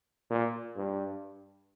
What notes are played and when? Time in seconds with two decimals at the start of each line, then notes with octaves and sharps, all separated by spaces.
0.30 A#2
0.76 G2